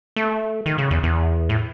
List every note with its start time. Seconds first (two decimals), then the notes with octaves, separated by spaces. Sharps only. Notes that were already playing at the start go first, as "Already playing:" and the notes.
0.16 A3
0.66 D#3
0.78 C#3
0.91 E2
1.03 E2
1.49 A2